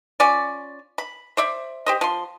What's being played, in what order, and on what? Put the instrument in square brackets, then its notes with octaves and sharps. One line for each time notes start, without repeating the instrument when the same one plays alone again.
[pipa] C#4 F4 D5
B5
C5 D5 E5
G4 C5 D#5
F3 C6